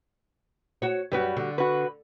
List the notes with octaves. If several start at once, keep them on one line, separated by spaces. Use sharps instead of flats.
F#4 C#5
F#2 G3 F#4 B4
D3
F#4 B4